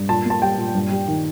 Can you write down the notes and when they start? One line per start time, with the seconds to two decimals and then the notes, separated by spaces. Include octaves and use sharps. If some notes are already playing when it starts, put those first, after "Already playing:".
Already playing: G2
0.09 A#2 A5
0.25 A#3
0.30 A5
0.42 G3 G5
0.58 A#2
0.75 G2
0.91 G3
1.08 D#3